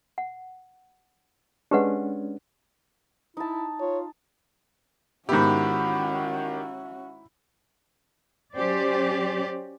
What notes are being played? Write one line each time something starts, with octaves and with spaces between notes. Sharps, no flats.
F#5
G#3 C#4 D4 G4 B4 F#5
D#4 E4 A5
F4 C#5
G#2 D#3 B3 C#4 E4 F#4 G4
F#3 C#4 G4 C5 D5